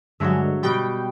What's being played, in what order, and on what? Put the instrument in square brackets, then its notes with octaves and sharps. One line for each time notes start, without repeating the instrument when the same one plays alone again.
[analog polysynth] G2 D3 G#3 [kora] F#3 C#5 E5
[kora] B2 G3 [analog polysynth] G5